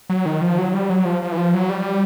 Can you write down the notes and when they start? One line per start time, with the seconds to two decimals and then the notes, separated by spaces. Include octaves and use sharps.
0.10 F#3
0.26 D#3
0.41 F3
0.58 F#3
0.74 G3
0.90 F#3
1.05 F3
1.22 F3
1.32 E3
1.38 F3
1.54 F#3
1.69 G3